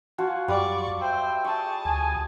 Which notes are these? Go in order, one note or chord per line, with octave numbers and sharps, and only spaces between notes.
F4 F#4 F#5 G#5 A5
F#2 G3 D5 C#6
C5 E5 G5
G#4 A5 C#6
D2 G#5 D#6